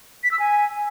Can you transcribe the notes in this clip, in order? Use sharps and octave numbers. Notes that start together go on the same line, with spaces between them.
B6
E6
G#5